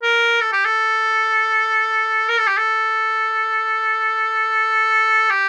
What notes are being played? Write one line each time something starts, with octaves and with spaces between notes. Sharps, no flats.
A#4
A4
G4
A4
A#4
A4
G4
A4
G4